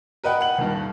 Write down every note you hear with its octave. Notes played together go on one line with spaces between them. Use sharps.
A#4 B4 D#5 F#5 G5
F#5 F#7
D#1 G2